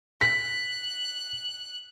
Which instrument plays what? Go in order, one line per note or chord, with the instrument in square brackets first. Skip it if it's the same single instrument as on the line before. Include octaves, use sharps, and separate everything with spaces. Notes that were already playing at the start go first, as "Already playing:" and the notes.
[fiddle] F#6 [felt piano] B6